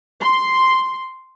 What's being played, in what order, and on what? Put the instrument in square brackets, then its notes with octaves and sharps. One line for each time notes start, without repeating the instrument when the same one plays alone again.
[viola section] C6